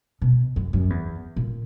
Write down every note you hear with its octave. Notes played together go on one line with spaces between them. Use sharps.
B2
F#2
F#2
E2
A#2